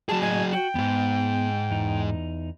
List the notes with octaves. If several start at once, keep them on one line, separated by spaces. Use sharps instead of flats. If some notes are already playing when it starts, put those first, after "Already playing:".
F#3 G#4 A5
A2 F#4 D#5 G#5
F#4 G5
F2 G#2 B3
E2 D#4